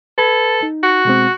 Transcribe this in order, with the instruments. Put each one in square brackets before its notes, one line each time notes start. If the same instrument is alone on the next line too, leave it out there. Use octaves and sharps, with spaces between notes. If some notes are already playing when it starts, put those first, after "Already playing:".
[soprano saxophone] A4 [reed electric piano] B4 B5 G#6
[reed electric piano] D#4
[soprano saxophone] F#4
[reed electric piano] B2 G#3 C4